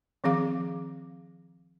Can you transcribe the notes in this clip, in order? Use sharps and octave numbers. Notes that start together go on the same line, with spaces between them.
D#3 F3 C4 G#4 F5 D6